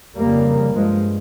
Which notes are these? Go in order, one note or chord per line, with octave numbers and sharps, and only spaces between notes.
F2 C#3 G3 A#3
G2 F3 G#3